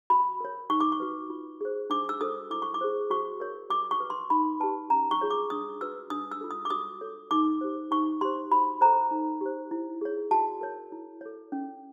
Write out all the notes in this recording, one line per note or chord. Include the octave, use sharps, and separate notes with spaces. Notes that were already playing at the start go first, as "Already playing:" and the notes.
F#4 B5
A#4 C#5
D#4 C#6
D6
C#6
F#4 B4
F4
G#4 C5
D4 D6
E6
F#4 A4 C5 D#6
E4 D6
C#6
D6
G#4 C5
F#4 C#6
A#4 C#5
F#4 D6
C#6
B4
C6
D#4 B5
G4 B4 A5
C#4 A#5
C#6
F4 G#4 C#5
D6
D4 D#6
F#4 B4 E6
D4 D#6
E6
F4 A4
D#6
D6
F#4 D#6
A4 C#5
D#4 D6
G4 C5
D#4 C#6
G4 C5 C6
F#4 B5
A4 C5 A#5
D#4
G4 C5
E4
G#4 C#5
F#4 A5
A#4 C#5
E4
A4 C#5
C#4